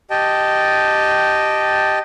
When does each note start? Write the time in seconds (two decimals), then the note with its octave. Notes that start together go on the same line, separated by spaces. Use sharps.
0.10 G4 D#5 G5 A5